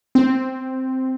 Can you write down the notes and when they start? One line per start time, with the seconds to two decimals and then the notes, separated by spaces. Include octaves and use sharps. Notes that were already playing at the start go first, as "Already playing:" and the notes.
0.15 C4